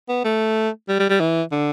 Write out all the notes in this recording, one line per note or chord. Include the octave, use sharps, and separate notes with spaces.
B3
A3
G3
G3
G3
E3
D3